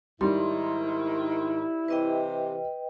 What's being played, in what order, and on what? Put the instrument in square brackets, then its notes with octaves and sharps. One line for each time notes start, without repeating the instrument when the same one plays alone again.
[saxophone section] G#2 D#3 [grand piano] G3 [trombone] E4 [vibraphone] C6
[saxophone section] C3 E3 [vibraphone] B4 D#5 G5